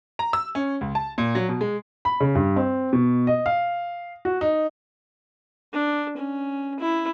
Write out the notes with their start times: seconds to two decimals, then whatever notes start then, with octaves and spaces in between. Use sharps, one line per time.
0.19 A#5
0.33 E6
0.55 C#4
0.81 C#2
0.95 A5
1.18 A#2
1.35 F#3
1.49 B2
1.61 G#3
2.05 B5
2.20 C#3
2.35 G2
2.56 C4
2.93 B2
3.27 D#5
3.46 F5
4.25 F#4
4.41 D#4
5.73 D4
6.17 C#4
6.80 E4